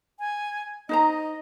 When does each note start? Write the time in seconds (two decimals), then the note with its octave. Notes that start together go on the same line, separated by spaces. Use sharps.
0.19 G#5
0.89 D#4 C5 D#5 A#5